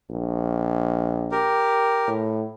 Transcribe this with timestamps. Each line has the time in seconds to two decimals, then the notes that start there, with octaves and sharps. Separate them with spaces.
0.10 A#1
1.32 G4 A#4
2.08 A2